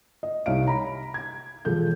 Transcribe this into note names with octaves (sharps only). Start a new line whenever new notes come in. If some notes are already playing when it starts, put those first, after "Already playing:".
D#5
C2 D#4 C#5 F5 D7
A#5 B5
G#6
E1 F3 F4 G#4 A4 G6